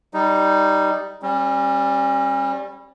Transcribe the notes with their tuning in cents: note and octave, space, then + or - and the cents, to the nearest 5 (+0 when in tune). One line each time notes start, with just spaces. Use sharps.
G3 -5 D#4 +0
G3 +0 C#4 -40